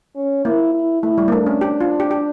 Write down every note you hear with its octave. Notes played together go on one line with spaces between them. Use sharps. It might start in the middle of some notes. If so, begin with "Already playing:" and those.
C#4
A#3 E4
E4
A3 E4
G3
A#3
A3 D4
C#4
G4
F4
G4
G4